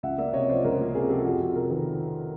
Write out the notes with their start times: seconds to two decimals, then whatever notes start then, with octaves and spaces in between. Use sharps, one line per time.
0.03 C#2 E5 F#5
0.18 A#3 D5 E5
0.33 C3 C#5 D#5
0.48 F3 C5 D5
0.64 C#2 A#4 C5
0.80 A#3
0.94 C3 G#4 A#4
1.09 F3 G4 A4
1.25 F2 F#4 G#4
1.40 F2
1.55 C3 G#4 A#4
1.70 D#3 A4 B4